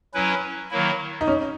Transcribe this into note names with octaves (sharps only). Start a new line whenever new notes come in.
F#3 C#4 E4 B4
D#3 F#3 A#3 E4
D#4
C#4